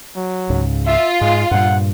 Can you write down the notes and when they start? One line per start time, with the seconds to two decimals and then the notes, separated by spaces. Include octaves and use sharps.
0.16 F#3
0.50 C#2 G#2 C#3
0.87 F4 E5
1.21 G#2 G#3
1.51 G2 A#2 G3 F#5